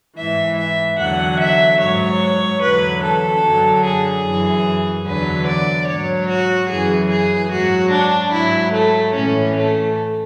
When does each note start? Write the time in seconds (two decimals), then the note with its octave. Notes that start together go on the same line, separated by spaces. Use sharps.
0.16 G#2 E3 E5
0.58 E5
0.99 E2 D3 F#3 F#5
1.39 E5
1.80 G#2 F#3 C#5
2.61 E2 D3 F#3 B4
3.03 A4
3.44 F#2 D3 F#3
3.84 G#4
4.25 F#2 E3
5.06 E2 D3 F#3 B4
5.47 D5
5.88 G#2 F#3 C#5
6.29 F#4
6.70 F#2 C#3 E3 G#4
7.10 G#4
7.51 G#2 F#3 F#4
7.92 D4
8.33 G#2 F#3 E4
8.74 A3
9.15 A2 E3 C#4
9.56 A3